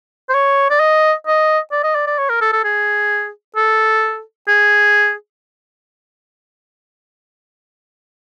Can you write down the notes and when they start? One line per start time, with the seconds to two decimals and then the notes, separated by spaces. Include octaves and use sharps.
0.29 C5
0.34 C#5
0.70 D5
0.80 D#5
1.27 D#5
1.72 D5
1.84 D#5
1.95 D5
2.07 D5
2.18 C#5
2.29 A#4
2.41 A4
2.53 A4
2.64 G#4
3.56 A4
4.48 G#4